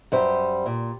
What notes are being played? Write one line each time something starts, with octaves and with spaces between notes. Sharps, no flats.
F#2 G3 C5
A#2